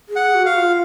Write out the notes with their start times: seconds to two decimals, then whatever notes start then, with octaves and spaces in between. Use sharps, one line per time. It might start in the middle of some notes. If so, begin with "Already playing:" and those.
0.09 G#4
0.16 F#5
0.31 G#4
0.35 F#4
0.46 F5
0.54 F#4
0.57 F4